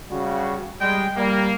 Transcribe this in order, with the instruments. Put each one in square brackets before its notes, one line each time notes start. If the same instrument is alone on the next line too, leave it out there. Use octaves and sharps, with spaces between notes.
[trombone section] C#3 G3 F#4
[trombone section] G3 [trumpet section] G#3 G5
[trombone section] G3 [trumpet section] A#3